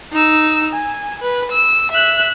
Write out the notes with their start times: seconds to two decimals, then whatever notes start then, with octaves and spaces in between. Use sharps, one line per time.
0.12 D#4 E6
0.73 G#5
1.22 B4
1.51 E6
1.91 E5 F#6